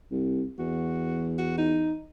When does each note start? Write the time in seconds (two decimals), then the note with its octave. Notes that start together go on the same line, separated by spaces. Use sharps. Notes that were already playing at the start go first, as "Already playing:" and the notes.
0.11 C2
0.59 E2 F#4
1.38 F#4
1.58 D#4